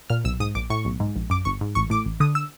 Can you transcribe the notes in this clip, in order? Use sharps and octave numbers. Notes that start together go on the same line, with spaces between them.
A#2 F6
B1 E6
G#2 D#6
A#1 D6
A2 C#6
B1
G#2
A#1
F#2 D6
G1 C#6
G#2
A1 C#6
A2 D6
A1
D3 D#6
E6